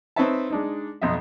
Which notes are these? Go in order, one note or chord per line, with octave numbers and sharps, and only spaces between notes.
C4 D#4 B4 C#5 E5 A5
G#3 D4 D#4
B1 F2 D#5 E5